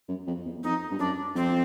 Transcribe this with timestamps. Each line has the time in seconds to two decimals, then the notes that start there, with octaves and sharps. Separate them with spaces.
0.08 F#2
0.27 F2
0.46 E2
0.63 F2 D#4
0.91 G2
0.99 F#2 D4
1.35 F2 C4